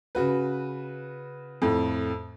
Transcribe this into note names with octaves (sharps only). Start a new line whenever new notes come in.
C#3 F#4 B4
F2 A2